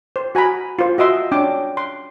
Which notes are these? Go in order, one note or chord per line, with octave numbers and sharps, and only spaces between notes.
C5
F#4 G#5 A#5 B5
F4 C5
F#4 D#5 E5 C6
C#4 D4 G5 D6
C6